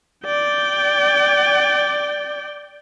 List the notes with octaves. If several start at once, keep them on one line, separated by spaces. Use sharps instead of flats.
D5 G5